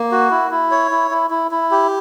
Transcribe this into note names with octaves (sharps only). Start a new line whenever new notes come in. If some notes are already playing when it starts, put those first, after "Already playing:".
Already playing: A#3
F#4
E4
E4
C#5
E4
E4
E4
E4
G4